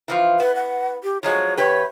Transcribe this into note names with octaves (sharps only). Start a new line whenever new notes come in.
E3 F3 F4
B3 B4
F#5
G4
F3 F#3 G#3 C#5
E2 G4 B4 C#5